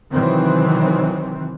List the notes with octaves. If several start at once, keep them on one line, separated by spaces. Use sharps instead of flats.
C3 D#3 E3 F#3 C4